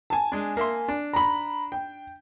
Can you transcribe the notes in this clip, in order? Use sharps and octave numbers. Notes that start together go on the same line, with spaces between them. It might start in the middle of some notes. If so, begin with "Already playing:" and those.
G#5 A5
G#3 D4
A#3 E5 C6
D4
A#5 B5
G5